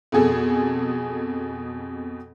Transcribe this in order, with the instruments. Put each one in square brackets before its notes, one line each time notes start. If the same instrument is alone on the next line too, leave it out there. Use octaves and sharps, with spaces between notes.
[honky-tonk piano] F2 B2 G#4 A4